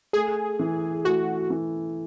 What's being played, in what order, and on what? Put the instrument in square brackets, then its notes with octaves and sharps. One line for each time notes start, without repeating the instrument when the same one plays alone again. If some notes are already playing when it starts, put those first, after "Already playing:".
[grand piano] A3 [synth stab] G#4
[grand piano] E3
[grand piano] A3 [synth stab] F#4
[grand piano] E3